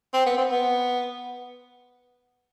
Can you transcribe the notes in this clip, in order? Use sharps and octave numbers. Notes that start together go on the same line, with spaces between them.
C4
B3
C4
B3